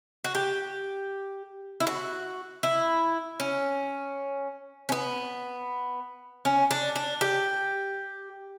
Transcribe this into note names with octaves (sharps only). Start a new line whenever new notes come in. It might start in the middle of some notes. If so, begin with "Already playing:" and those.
F#4
G4
E4
F#4
E4
C#4
C#4
B3
C#4
D4
D4
G4